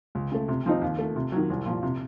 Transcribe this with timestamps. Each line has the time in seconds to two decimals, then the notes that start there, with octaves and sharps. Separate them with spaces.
0.15 C#2
0.32 C#3 A3
0.48 C3
0.66 F3 C4 D#4
0.82 D#2
0.98 D#3 A3
1.16 C3
1.32 D#3 F#3
1.50 C2
1.65 A#2 F3
1.83 C3